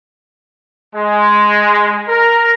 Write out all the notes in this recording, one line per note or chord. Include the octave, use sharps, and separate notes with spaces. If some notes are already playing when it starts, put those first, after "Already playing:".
G#3
A#4